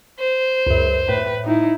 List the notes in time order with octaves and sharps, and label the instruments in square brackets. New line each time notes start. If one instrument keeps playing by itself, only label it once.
[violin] C5
[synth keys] C#2 F#2
[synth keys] A2 [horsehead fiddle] B4
[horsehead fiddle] D#4 E4